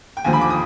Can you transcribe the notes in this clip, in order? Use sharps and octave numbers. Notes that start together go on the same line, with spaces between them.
G5
D#2 D3 F3 G#5
B5
D6
D#6